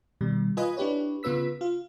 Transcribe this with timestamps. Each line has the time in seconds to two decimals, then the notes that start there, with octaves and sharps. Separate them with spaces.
0.21 B2 D#3 G3
0.57 F4 B4 D#5 G#5 B5 D#6
0.77 D4 E4 G4 B4 C#5
1.23 C#3 B3 F4 B4 E6 B6
1.61 F4 F5